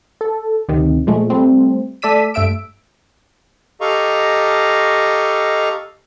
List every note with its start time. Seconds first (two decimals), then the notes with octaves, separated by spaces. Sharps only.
0.21 A4
0.69 D2 C3 D#3
1.07 A#2 F3 G#3 A3
1.30 G3 A3 C4
2.02 A3 A4 D5 E6 B6 D#7
2.34 G2 A3 E5 E6 D7
3.81 G4 A4 D#5 F5 A#5 C#6